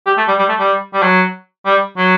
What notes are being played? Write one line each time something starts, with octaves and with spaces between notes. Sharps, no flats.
G4
A3
G3
G3
A3
G3
G3
F#3
G3
F#3